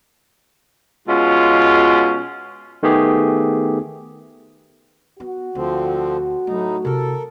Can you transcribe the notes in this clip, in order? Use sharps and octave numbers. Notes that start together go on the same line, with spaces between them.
B2 G#3 C#4 F4
D#3 A3 B3 G4 G#4
B3 F#4
D2 D3 F3 C4
A2 F#3 A3 D#4
C3 E4 A4 A#4